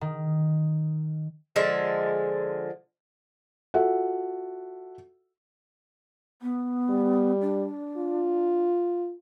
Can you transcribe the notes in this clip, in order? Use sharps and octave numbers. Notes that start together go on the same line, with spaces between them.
D#3
D3 F3 G#3 E5
F4 F#4 A4 E5 F#5
B3
G3
D4
F4